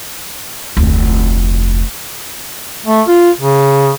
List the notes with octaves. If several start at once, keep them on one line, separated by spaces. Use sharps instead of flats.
F1 D2
A3
F4
C#3